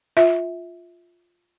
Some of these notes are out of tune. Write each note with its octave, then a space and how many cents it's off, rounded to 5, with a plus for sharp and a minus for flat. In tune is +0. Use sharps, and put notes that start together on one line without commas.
F4 +0 E5 -15